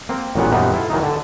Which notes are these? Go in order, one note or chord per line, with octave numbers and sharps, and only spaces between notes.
A#3 C4
A1 A#2 F#3 B3 F#5
F#2 A#2 G3 B3 D#4 F5
E4 F4 A4
D#3 E3 F#3 D#4
D3 A5